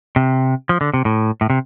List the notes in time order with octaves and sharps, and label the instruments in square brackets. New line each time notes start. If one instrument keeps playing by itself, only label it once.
[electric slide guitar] C3
F3
D3
C3
A2
A2
C3